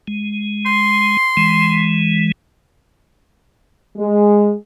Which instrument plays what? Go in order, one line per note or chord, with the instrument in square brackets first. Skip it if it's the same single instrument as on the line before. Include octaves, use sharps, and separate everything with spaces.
[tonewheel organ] G#3
[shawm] C6
[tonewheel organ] E3 G#3
[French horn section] G#3